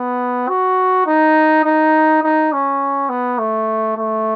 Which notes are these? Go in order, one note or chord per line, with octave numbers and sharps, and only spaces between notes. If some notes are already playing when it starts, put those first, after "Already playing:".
Already playing: B3
F#4
D#4
D#4
D#4
C#4
B3
A3
A3